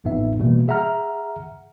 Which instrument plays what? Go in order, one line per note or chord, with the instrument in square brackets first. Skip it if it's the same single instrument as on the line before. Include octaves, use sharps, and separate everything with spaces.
[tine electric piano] A1 F2 A2 B3 D#4 E5
B2 E3 G3 A#3
G#4 E5 F#5 A#5 F6